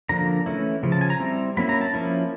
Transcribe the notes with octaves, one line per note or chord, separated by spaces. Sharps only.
D3 F3 A#3 D4 A#5
E3 A3 C#4 E4
C#3 F3
A5
G#5
A#5
G3 C4 E4
F#3 A#3 C#4 E4 B5
A#5
A5
F3 A#3 C#4 E4